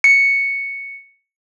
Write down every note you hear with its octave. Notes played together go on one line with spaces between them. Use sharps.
C#7